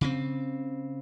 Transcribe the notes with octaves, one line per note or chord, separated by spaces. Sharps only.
C#3 C4